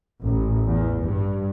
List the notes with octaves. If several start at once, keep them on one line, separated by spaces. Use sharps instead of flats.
A1
E2
G2